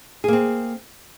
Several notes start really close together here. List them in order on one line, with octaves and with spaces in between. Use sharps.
G#4 A#3 C4